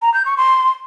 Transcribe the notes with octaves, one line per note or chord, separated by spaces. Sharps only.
A#5
G6
C#6
C6